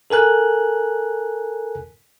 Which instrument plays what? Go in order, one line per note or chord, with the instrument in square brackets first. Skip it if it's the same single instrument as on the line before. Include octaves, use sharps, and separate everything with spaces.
[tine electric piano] A4 A#4 G#5 F#6